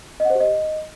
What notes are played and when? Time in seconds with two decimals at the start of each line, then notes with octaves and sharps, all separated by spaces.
0.20 D#5
0.25 F#5
0.30 C5
0.35 G4
0.40 D#5